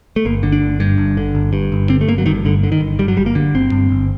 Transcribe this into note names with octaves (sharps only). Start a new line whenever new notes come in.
A3
G1 A#3
D3
D4
G1
G2
G1
D3
G1
G2
G1
D3 C4
A3
G1 A#3
F#3
G2 D#3
G1 D3
D3
D#3
G1
G2 G3
F#3
G1 G3
A#3
D3
G1 C4
G2
G1